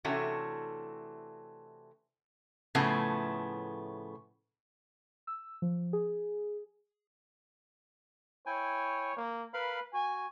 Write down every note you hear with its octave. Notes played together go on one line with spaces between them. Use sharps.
C3 E3 A3 C#4 D4 F#4
A2 C#3 F3 A3 B3
E6
F3
G#4
E4 C#5 G5 G#5
A#3
A#4 B4 F5 B5
F#4 G#5